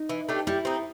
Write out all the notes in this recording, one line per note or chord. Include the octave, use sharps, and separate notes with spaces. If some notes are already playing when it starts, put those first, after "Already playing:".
Already playing: D#4
E3
A3 D4 G4
G3 E4
C4 D#4